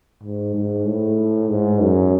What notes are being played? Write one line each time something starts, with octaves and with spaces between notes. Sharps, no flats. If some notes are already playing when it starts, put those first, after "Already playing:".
G#2
G#2
A2
G#2
F#2